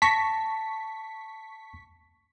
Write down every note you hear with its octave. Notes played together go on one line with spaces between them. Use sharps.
A5 C#6 A#6 B6